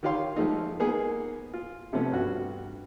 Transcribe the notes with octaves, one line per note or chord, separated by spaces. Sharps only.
D#3 F4 G4 C#5 F5 C6
F3 G#3 A3 D#4
A#3 B3 D#4 G#4
F4
C3 F3 A3 B3 C#4
G2 F#4